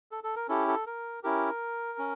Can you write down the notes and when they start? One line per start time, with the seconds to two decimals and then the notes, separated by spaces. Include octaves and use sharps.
0.11 A4
0.24 A4
0.36 A#4
0.48 C#4 E4 G4 A4
0.68 A4
0.86 A#4
1.23 C#4 E4 G4 A#4
1.99 C#4